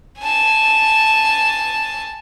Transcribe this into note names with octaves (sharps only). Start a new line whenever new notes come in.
G#5 A5